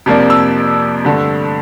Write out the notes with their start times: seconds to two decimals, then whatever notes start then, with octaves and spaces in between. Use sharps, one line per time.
0.06 F2 C3 F3 A#3 D4
0.30 E6
1.05 G2 D3 A3